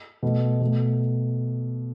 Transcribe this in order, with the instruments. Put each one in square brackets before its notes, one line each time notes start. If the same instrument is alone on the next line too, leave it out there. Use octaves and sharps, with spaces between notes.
[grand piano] B2 A3
B2 A3